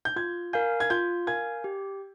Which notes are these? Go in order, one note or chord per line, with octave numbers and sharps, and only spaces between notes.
G6
F4 G#6
A#4 F5 G#5 G6
G#6
F4 G6
A#4 F5 G#5 G#6
G4